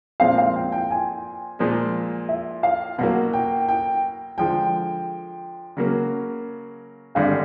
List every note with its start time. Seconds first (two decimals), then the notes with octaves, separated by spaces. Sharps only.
0.20 A#2 F3 G#3 C4 F5
0.38 F5
0.55 G5
0.72 G5
0.90 G#5
1.59 A#2 F3 G#3
2.29 E5
2.63 F5
2.98 B2 F#3 A#3 F#5
3.33 G5
3.69 G5
4.38 D3 F3 G#3 G5
5.77 C#3 F#3 A#3
7.15 G#1 G2 D3 F5